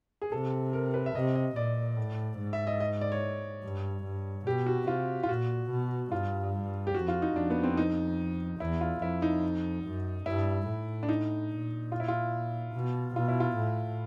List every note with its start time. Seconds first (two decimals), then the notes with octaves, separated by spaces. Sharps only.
0.22 G#4
0.32 C3 A4
0.73 A#4
0.94 B4
1.06 E5
1.15 C3 D#5
1.35 D#5
1.56 A#2 D5
1.97 A2
2.39 G#2
2.53 E5
2.67 D#5
2.80 D#5
3.01 D5
3.12 C#5
3.63 G2
4.04 G2
4.47 B2 G4
4.66 F#4
4.87 C3 F4
5.23 F4
5.29 A#2 F#4
5.70 B2
6.12 G2 F4
6.87 G4
6.95 F2 F#4
7.08 F4
7.22 D#4
7.36 F2 D4
7.50 B3
7.63 C4
7.77 D#4
8.60 E2 E4
8.81 F4
9.02 F2 E4
9.22 D#4
9.85 F#2
10.26 G2 E4
10.67 A2
11.03 D4
11.09 D#4
11.51 A#2
11.92 F4
12.00 E4
12.08 F4
12.74 B2
13.16 B2 F4
13.28 E4
13.40 F4
13.57 A2